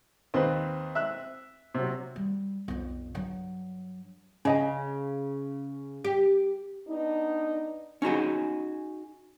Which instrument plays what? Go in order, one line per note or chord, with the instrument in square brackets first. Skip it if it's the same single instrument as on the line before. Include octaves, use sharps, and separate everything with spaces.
[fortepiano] D#2 [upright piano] C4 B4
[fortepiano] E5 F#6
[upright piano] C3 F#3
[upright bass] G3
B1 F2
G2 F#3
[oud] C#3 [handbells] C#4 D#5 G#5
[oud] G4
[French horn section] B3 D4 D#4
[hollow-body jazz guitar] C#4 D#4 F#4 G#4